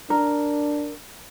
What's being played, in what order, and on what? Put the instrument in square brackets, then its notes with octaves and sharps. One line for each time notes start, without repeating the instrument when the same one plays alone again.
[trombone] D4 [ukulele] A#4